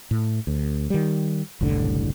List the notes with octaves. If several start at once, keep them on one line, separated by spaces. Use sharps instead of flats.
A2
D2
D#3 G3
F#1 C2 A2 D3